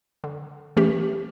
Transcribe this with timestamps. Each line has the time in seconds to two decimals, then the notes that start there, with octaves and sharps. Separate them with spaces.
0.24 D3
0.77 E3 A3 C#4 G4